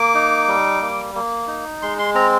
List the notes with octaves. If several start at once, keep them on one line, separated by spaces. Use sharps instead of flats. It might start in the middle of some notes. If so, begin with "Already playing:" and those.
Already playing: A#3 D6
D#4
G3
A#3
A#3
D#4
G#3 C6
C6
C4 A#5